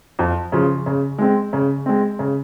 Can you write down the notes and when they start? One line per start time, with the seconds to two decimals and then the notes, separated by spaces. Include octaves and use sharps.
0.19 F2
0.52 C#3 F3
0.86 C#3
1.18 G#3 C4
1.53 C#3
1.86 G#3 C4
2.19 C#3